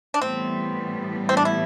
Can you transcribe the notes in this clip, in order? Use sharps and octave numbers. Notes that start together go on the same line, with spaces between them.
D4
A2 E3 G3 B3 C4
C4
D4
E4